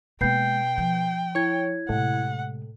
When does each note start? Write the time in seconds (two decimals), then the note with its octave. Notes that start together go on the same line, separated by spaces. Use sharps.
0.21 B2 G#3 A#3 G5 G6 C7
0.78 F3
1.35 E4 C#5 G#6
1.89 A2 C3 G#3 F#5